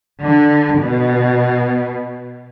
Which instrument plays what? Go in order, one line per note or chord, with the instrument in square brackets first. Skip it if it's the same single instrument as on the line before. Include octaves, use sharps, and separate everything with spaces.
[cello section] D3
B2